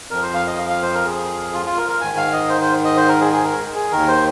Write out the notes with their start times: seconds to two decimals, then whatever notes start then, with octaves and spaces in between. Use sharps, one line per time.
0.11 F2 F3 A#4
0.22 C5
0.34 F5
0.47 D#5
0.58 F5
0.70 F5
0.82 C5
0.94 A#4
1.06 G#4
1.54 F4
1.66 F4
1.78 A#4
1.89 A#4
2.01 G#2 D#3 G#5
2.17 F5
2.33 D#5
2.49 C5
2.61 C5
2.85 D#5
2.97 C5
3.08 A#4
3.21 G#4
3.33 G#4
3.44 A#4
3.76 G#4
3.92 D#2 D#3 A#4
4.08 C5